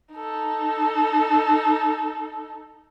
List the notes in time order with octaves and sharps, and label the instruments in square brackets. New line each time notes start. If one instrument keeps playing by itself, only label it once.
[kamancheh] D#4 A4